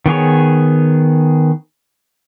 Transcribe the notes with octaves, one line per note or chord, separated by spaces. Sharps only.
D#3 B3 G#4 C#5